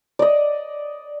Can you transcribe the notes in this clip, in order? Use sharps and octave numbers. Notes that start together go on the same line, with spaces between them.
D5 D#5